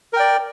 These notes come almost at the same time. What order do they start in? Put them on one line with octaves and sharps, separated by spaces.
A#4 G5 D5